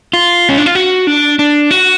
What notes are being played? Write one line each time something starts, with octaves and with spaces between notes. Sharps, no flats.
F4
C#4
D4
F4
F#4
D4
D4
F#4